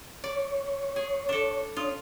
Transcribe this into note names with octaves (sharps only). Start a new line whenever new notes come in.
C#5 D5
G#4
D4 A4
D4 F4 C#5 D#6